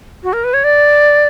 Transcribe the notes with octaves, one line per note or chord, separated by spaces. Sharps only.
F#4
A#4
B4
C#5
D5